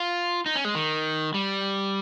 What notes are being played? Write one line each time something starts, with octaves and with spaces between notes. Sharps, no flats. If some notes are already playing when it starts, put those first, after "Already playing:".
Already playing: F4
D#4
C#4
G#3
D#3
G3